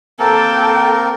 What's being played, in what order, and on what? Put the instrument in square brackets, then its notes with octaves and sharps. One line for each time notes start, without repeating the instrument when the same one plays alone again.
[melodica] A#3 C4 A#4 [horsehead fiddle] A4 G5